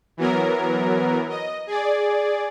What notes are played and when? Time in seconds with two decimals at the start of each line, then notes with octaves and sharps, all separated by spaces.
0.17 E3 F#3 B3 A#4
1.29 D#5
1.67 G#4 D5